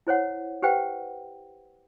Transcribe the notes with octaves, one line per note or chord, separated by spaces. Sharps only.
E4 C5 C#5 F#5
G4 B4 C5 F#5 G5